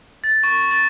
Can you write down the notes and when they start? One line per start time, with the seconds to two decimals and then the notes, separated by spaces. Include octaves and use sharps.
0.24 A6
0.44 C#6
0.71 A6